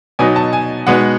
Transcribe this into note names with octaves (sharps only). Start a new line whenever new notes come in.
B2 F#3 B3 D#4 G#5
A5
G#5
B2 G#3 B3 D#4 F#5